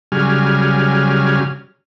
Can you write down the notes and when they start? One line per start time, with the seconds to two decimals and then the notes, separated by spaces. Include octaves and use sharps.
0.12 C#3 F#3 G3 G#5 F6